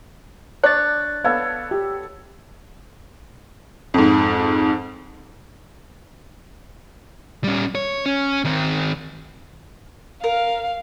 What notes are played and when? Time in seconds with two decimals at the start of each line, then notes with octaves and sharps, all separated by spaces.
0.64 D4 C#5 F#6 A6
1.24 B3 A4 C#5 F5
1.71 G4
3.94 F2 G#2
7.44 G3 C#4
7.75 C#5
8.06 C#4
8.45 D#3 C4
10.24 A#4 F5